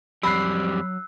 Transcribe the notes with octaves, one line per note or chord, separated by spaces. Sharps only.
F2 F#3 G3 B5 E6 F#6 C7